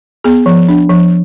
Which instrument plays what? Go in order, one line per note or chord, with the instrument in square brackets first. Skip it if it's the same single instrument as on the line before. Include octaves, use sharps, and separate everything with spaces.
[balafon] B3 G#4
F3
D4
F3